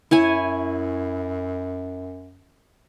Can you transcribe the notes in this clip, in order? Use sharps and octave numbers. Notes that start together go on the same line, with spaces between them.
F#2 E4 C#5 G#5